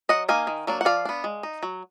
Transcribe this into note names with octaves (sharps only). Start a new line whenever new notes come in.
F#3 D#5 F#5
A#3 D#4 F5 G#5
D#3
F#3 A#3 D4
F#5
F3 D5 F5
B3 D4
G#3
D#4
F#3